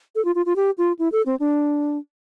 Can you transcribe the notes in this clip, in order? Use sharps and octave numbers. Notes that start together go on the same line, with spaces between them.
A4
F4
F4
F4
G4
F4
E4
A4
C4
D4